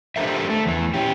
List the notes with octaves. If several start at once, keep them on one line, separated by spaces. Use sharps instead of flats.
D4 G4 A4 A#4 C5 E5
A3
E2 E3
C#4 G4